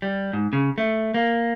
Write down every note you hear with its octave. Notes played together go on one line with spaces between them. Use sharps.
G3
G#2
C#3
A3
A#3